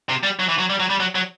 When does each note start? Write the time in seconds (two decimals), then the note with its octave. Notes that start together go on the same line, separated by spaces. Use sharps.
0.09 C3
0.23 G3
0.40 F#3
0.49 E3
0.59 F#3
0.70 G3
0.80 F#3
0.90 G3
1.00 F#3
1.15 F#3